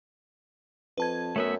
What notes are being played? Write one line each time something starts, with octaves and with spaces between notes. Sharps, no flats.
F2 B4 A5 G#6
F#2 A3 B3 E5